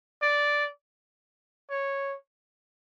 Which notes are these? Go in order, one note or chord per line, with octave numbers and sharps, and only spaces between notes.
D5
C#5